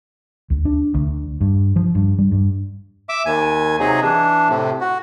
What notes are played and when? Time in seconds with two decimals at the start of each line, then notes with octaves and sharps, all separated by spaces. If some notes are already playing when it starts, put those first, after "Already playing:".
0.50 D2
0.65 D4
0.94 D2
1.41 G2
1.76 F3
1.95 G2
2.19 G3
2.32 G2
3.09 E5 D6
3.26 D#2 G#5
3.80 C3 F#3 D#4 G#4
4.03 E3 D4
4.49 A2 C3
4.81 F#4